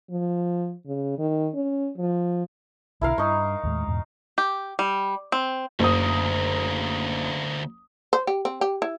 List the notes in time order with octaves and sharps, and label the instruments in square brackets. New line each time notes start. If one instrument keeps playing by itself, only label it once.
[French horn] F3
C#3
D#3
C#4
F3
[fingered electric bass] B1 B2 D3 [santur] E4 A#4 F5
[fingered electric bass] G2 [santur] D#4 C#6
[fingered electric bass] D#2 A2 G#3
E2 G#2 B2
[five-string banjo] G4
G3
C4
[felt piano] F#1 D#6 [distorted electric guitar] D2 A#3
[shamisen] C5
G4
C4
G4
E4